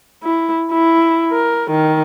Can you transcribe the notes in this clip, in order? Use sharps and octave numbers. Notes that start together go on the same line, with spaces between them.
E4
E4
A#4
D#3